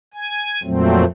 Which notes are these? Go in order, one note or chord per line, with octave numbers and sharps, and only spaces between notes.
G#5
F2 A#2 F#3 A3 C4